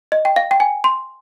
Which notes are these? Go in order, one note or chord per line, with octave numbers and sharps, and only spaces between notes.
D#5
G5
F5
G5
G#5
C6